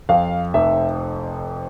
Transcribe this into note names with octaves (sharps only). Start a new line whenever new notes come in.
F2 F5
F1 E5